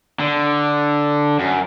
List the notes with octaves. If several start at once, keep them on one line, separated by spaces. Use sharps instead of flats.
D3
F#2